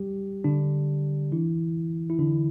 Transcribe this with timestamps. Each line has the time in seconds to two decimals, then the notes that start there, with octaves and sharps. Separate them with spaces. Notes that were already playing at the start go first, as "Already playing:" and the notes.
Already playing: G3 G4
0.44 D3 D4
1.32 E3 E4
2.10 E4
2.19 D3 D4